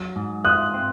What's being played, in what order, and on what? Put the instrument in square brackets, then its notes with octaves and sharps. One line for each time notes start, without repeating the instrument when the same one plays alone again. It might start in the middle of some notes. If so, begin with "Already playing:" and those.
Already playing: [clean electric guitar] F#3
G#2
[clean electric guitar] F4 [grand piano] D#6 F#6
[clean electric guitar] C4